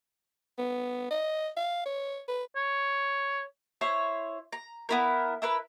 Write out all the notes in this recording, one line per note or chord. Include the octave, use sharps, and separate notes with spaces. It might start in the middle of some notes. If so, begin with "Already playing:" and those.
B3
D#5
F5
C#5
B4
C#5
E4 C5 C#5
A#5
B3 E4 A#4
E4 A#4 B4 E6